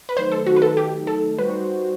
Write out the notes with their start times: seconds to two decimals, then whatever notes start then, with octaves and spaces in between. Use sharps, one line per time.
0.09 B4
0.17 D#3 F#3 A3 D#4 C5
0.32 A4
0.46 F#4
0.56 B4
0.62 A4
0.77 G4
1.07 A4
1.38 G3 D#4 F#4 B4 C5